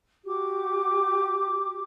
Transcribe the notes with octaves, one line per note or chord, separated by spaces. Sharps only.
F#4 G4 D6